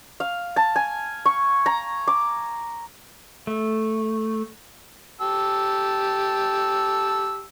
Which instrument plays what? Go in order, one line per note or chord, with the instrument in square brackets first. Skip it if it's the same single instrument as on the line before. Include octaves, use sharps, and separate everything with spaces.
[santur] F5
A5
G#5
C#6
A#5
D6
[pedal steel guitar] A3
[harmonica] G4 A5 E6